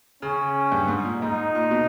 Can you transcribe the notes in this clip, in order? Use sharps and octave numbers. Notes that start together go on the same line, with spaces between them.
C#3 C#4
G2
G#2
A#2
G#2 D#4
A#2
B2